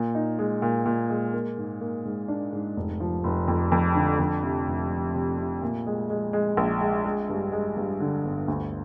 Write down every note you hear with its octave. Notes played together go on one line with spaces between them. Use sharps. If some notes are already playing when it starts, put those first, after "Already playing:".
Already playing: A#2
D#4
G#3
A#2
A#2
G#3
A#3
G#2
A#3
G#2
D4
G#2
F1
F3
F1
F2
F2
D3
F2
C3
F1
F1
C3
C3
A#2
G#3
G#3
G#3
A#1
G#3
G#3
G2
G#3
G2
D3
G1
D2